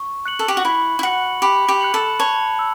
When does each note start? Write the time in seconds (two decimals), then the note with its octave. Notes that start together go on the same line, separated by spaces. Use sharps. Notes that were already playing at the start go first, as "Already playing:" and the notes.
Already playing: C#6
0.26 F#6 C#7 F#7
0.39 A4
0.48 G4
0.57 F#4
0.65 E4 B5
0.99 E4
1.03 F#4 F#6 C#7 F#7
1.42 G4 B5
1.68 G4
1.81 F#6 C#7 F#7
1.94 A4
2.20 C#5 A5
2.59 E6